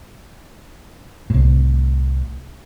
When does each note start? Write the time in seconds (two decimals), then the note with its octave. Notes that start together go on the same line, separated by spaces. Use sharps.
1.30 C2 A2